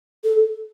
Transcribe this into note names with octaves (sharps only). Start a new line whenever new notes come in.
A4